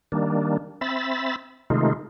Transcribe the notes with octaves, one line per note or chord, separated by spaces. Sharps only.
D#3 G3 A#3 D4
C4 E5 B5 A6
C3 D#3 G#3 A3 D#4 F4